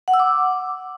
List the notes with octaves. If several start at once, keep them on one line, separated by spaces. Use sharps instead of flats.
F#5
E6
D6